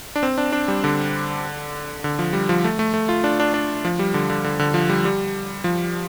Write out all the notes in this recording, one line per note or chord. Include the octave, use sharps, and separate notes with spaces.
D4
C4
D4
D4
G3
D3
D3
F3
G3
F3
A3
A3
A3
F4
D4
D4
D4
F3
G3
D3
D3
D3
D3
F3
G3
G3
F3